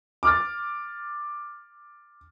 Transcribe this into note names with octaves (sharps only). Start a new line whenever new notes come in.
D6 F6 A6